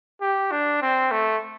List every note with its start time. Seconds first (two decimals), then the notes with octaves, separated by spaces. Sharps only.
0.21 G4
0.51 D4
0.82 C4
1.12 A3